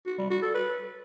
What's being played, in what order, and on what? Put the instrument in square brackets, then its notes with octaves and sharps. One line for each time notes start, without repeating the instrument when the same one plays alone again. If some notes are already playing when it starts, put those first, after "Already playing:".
[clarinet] F#4
G3
F#4
A4
B4